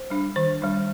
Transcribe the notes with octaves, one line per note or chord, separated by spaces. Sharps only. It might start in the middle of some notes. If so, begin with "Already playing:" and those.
Already playing: C5
G3 D4
D#3 C5
G3 D4